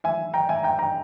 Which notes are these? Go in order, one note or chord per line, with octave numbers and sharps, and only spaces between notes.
E5 G#5
G5 A#5
E5 G#5
G5 A#5
G5 A#5